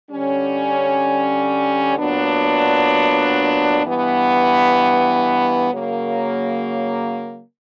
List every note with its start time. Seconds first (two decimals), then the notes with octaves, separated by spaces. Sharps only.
0.11 D3 G3 C#4
1.98 A#2 F#3 B3 D4
3.85 G2 E3 B3
5.72 C#3 F#3 A#3